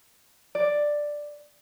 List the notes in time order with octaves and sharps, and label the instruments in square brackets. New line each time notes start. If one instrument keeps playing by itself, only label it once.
[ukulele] D5